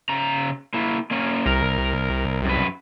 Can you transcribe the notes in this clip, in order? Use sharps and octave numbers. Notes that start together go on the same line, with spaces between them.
C#3 A#5
A#3 E4
A#3 C#4
C2 A#4
F#2 B4